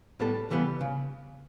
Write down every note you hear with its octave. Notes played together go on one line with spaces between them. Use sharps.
A2 G3 B3 A4
C#3 E3 G3 B3
C#3